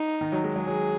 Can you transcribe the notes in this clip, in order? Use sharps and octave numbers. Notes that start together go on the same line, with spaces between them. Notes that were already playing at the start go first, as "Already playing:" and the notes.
Already playing: D#4
D#3
F#3
G#3
F#3 G#4
F#3